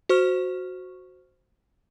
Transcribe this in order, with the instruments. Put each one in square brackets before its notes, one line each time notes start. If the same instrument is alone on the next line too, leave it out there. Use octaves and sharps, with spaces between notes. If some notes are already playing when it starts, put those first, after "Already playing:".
[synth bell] F#4 C5 C#6 F6